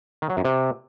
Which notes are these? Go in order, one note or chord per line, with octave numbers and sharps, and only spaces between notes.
D#3
F#3
F#2
C3